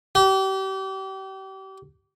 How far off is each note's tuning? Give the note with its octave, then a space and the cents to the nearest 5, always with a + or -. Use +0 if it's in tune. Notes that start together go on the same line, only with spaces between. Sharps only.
G4 -35